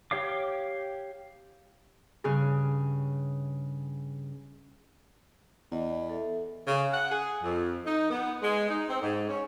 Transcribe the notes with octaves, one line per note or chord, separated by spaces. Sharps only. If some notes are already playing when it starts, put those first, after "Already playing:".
G4 C#5 F5 D6
G2 C#3 G#4
E2 D5 D#5
A4 E5
C#3
F#5
G#4
F2
D#4
B3
G#3
D#4
C4
G#2
C#4